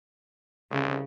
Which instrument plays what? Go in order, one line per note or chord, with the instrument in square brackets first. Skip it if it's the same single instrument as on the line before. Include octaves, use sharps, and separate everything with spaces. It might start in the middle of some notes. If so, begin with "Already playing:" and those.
[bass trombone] C2 [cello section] C#3